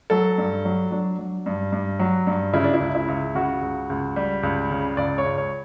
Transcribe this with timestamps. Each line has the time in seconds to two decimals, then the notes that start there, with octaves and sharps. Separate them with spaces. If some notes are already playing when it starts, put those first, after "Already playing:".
0.10 F#3 A4
0.38 G2
0.65 F#3
0.91 F#3 D4
1.18 F#3
1.46 G2
1.72 G2
1.99 F#3
2.27 G2
2.53 C#3 E4
2.64 D4
2.74 E4
2.80 C#2
2.95 E4
3.08 C#2
3.35 C#3 F#4
3.62 C#2
3.90 C#2
4.16 G3
4.43 C#2
4.71 C#3
4.97 C#2 D5
5.18 C#5
5.25 C#2
5.38 C#5